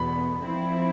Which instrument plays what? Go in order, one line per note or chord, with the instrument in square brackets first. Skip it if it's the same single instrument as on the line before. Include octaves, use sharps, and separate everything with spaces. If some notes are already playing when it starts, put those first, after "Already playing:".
Already playing: [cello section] E2 B2 B3 [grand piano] B5
[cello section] F3 C4 E4